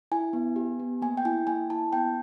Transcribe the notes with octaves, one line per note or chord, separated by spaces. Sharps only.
E4 G#5
B3
G4
B3
A#3 G#5
G5
E4 G#5
A#3 G#5
E4 A5
B3 G5